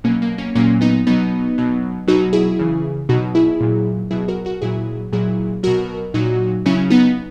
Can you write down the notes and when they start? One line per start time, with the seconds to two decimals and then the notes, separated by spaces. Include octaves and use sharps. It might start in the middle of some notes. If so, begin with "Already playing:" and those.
0.04 B2 F#3 A#3 C#4
0.22 A#3
0.38 A#3 C#4
0.55 A#2 F#3 A#3 C#4
0.81 B3 D#4
1.07 B2 F#3 B3 D#4
1.58 B2 F#3
2.07 B2 F#3 D#4 F#4
2.33 E4 G#4
2.59 C#3 E3
3.09 B2 F#3 D#4 F#4
3.35 E4 G#4
3.61 A#2 F#3
4.11 B2 F#3 E4 G#4
4.28 F#4 A#4
4.45 F#4 A#4
4.62 A#2 F#3 E4 G#4
5.12 A#2 F#3 E4 G#4
5.63 B2 F#3 F#4 A#4
6.14 A#2 F#3 D#4 F#4
6.65 C#3 F#3 C#4 E4
6.90 B3 D#4